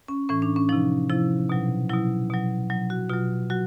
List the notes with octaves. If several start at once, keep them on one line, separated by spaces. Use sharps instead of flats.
C#4
A2 E3 C#4
D4
C#4
C3 F3 D#4
C3 F3 E4
B2 F#3
B2 F#3 E4
B2 F#3
B2 F#3
F#4
B2 F#3 F4
F#3 F#4